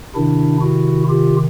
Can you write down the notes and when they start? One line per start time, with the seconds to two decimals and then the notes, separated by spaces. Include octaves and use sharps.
0.15 C3 D#3 D4 E4
0.62 E4 F#4
1.09 F4 G4